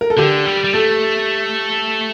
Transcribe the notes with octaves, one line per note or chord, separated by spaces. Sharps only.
A#4
A4
D3 G4
G3
G3
A3 A4